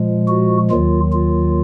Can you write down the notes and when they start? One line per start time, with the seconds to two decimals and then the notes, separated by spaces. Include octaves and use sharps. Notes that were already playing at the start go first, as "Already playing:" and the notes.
Already playing: A#2 F3 G#3
0.28 F#4
0.70 D#2 D#3 F#3 F4
1.12 F4